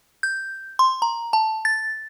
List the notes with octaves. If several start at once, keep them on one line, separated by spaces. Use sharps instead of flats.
G6
C6
A#5
A5
A6